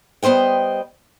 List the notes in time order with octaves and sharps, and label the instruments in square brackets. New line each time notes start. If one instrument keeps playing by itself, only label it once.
[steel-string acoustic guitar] G3 B3 C5 D#5 G5